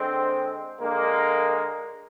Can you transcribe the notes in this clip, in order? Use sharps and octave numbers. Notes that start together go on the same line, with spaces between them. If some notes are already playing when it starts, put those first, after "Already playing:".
Already playing: D3 G#3 C4
D3 G#3 A#3